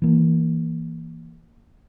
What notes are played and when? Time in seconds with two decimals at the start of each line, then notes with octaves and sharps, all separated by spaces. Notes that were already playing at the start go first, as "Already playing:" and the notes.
0.02 E3 A#3